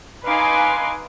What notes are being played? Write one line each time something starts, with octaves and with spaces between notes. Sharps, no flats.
D#4 B4 F5 G#5 C6 D6